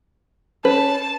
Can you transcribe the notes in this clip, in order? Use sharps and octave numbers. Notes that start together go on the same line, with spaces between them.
C#4 B4 A5